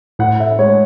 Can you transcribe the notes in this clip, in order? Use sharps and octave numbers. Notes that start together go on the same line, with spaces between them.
A2 F#5
E5
G#3 C#5